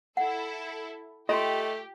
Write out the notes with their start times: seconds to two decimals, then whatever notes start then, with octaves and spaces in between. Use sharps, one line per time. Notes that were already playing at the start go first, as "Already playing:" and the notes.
0.17 E4 A4 F#5
1.29 A3 F4 G4 D#5 G5 C6